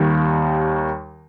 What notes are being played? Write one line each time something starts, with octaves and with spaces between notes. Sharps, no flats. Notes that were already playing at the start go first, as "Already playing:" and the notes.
Already playing: D#2 D#3 G3